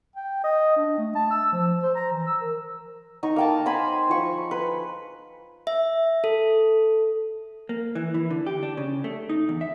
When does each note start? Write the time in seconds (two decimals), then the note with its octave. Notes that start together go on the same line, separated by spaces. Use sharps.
0.16 G5
0.44 D#5
0.77 D4
0.98 A3
1.15 A5
1.30 E6
1.52 F3
1.83 C5
1.95 A#5
2.12 E3
2.27 E6
2.41 A#4
3.23 D#4 C#6
3.36 A#3 G5 A5
3.66 C5 G#5 B5
4.09 F3 C#6
4.51 B4
5.67 E5
6.24 A4
7.69 A#3
7.95 E3
8.14 E3
8.30 D3
8.47 G4
8.63 D4
8.77 C#3
9.04 A3
9.29 D#4
9.49 E2
9.61 E5